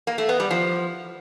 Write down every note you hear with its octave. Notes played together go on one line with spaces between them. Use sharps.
A#3
A3
B3
G3
F3